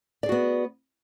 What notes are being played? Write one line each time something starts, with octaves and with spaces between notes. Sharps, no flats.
B3 F#4 G#4 D5